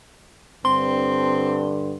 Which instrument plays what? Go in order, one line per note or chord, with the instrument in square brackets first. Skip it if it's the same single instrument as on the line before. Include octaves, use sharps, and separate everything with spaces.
[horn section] G2 D3 [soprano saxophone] C4 [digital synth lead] C6